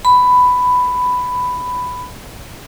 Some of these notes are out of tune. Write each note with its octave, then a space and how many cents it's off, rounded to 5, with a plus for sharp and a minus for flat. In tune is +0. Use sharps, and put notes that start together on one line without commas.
B5 +10